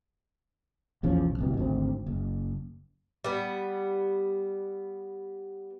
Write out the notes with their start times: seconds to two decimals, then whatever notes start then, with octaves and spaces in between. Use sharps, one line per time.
1.03 A#1 E2 F3 C#4
1.26 B1
1.39 D1 C2 B2
1.57 G#1 D2 C4
2.06 F#1
3.24 G3 B3